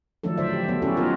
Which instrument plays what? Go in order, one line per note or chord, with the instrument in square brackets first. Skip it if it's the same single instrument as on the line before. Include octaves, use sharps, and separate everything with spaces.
[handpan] D#3 F3 F#3 A3 D4 A4
D3 F#3 C5 D5 E5
G4
F#3 B3
C#4 E4 F#4 G4 A4
B3 C4 D#4 F4 A#4